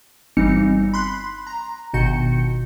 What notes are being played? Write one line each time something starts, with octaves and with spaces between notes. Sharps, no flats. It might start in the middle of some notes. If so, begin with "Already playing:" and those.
G1 E3 G3 C4 D#4 C#7
B5 C6 F#6
A#5
G1 B2 D#3 F#4 G6 C#7